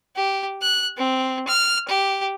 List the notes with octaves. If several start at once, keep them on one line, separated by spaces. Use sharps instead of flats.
G4
F#6
C4
F6
G4